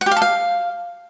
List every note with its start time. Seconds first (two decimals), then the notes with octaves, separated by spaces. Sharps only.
0.01 F#5
0.06 G4
0.11 F5
0.16 A4
0.22 F5